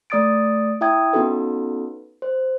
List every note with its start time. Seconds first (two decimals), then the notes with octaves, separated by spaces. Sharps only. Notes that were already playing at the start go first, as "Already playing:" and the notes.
0.10 A3 D5 D#6 A6 D7
0.81 E4 E5 G5 D#6 G#6
1.13 B3 C#4 D#4 F#4 A4 B4
2.22 C5